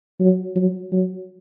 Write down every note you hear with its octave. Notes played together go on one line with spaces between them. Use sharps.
F#3
F#3
F#3